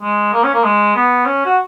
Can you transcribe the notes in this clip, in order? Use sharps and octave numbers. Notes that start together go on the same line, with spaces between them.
G#3
A#3
C#4
A#3
G#3
B3
C#4
F#4